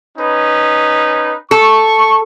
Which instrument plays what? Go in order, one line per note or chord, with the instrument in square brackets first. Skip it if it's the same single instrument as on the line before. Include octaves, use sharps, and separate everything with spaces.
[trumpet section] C#4 D#4 B4
[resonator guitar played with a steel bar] A4 [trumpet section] C#6